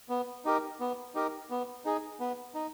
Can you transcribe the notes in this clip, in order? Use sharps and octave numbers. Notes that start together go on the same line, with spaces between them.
B3
D#4 G4 A#4
B3
D#4 G4 A#4
B3
D#4 G#4
B3
D#4